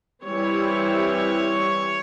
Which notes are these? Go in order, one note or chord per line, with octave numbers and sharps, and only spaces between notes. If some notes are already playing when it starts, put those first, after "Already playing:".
E3 G3 C4 E4 C#5